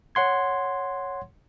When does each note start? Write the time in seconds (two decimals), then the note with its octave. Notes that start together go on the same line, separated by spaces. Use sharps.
0.15 C#5 F#5 C6 G#6